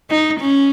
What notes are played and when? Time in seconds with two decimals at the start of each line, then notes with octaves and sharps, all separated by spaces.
0.10 D#4
0.39 C#4